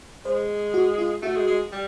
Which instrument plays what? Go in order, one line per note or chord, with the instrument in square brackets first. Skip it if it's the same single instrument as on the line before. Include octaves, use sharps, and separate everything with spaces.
[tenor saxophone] G#3 [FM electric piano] C5
[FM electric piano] F#4
F4
[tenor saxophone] A3 [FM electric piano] F#4
[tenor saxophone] G#3
G#3
G3